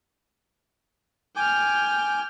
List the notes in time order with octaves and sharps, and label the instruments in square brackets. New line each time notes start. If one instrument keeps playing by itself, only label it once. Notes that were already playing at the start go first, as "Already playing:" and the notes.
[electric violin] G5 F6 [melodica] G#5 D6